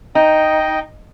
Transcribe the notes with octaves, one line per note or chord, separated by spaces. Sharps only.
D#4 D#5 G5